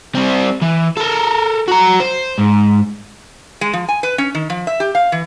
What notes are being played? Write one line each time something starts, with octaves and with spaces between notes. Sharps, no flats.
G3 C4
E3
A4 A#4
F#4 A#5
C5
G#2
G#3
F3
G#5
B4
C#4
D#3
F3
E5
G4
F5
E3